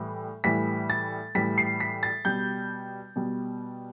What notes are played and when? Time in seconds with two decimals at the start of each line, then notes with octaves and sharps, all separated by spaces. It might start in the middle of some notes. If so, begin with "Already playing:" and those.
Already playing: A2 E3 G3
0.44 A2 E3 G3 B6
0.90 A6
1.35 A2 E3 G3 B6
1.58 C7
1.80 B6
2.03 A6
2.25 B2 G3 G6
3.16 B2 G3